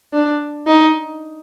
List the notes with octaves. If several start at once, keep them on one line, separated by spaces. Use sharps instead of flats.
D4
D#4